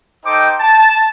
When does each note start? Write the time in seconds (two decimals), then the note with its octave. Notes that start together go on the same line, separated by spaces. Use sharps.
0.25 D#4 A4 C5 G5 D6
0.60 A5